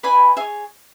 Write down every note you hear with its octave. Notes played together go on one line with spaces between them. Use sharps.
E4 B4 D5 G#5 B5
G#4 C#5 E5 G#5